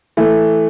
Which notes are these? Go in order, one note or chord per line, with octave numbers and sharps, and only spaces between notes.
E3 A3